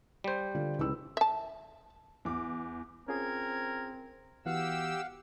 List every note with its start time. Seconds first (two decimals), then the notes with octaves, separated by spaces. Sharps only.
0.24 G3 C5
0.55 D3 F4
0.79 C#2 E4 E6
1.17 E5 A5
2.25 E2 D6
3.08 C4 C#4 F4 G#4 A#4 G#6
4.46 E3 B3 F#4 G4 F5 F#5 E6